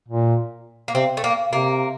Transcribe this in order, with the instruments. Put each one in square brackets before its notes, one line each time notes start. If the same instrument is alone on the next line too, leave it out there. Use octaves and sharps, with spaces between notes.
[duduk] A#2
[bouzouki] A#3
[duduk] C3 [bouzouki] C4
[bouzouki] A3
A#3
[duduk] C3 [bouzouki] A#3